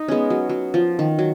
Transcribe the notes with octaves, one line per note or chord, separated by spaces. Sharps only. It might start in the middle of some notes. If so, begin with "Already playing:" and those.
Already playing: D#4
G#3 B3 C#4
F#3
F#3
F3
D#3
F#3